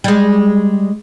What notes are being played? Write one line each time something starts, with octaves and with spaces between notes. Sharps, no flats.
G3 G#3